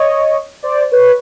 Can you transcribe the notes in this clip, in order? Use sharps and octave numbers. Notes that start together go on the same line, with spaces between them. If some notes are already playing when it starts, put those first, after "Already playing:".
Already playing: C#5 D#5
C5 D5
B4 C#5